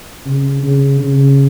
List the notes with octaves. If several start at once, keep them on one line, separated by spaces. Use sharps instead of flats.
C#3
C#3
C#3